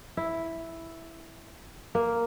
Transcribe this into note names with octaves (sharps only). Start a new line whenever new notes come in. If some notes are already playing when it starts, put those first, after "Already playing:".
E4
A#3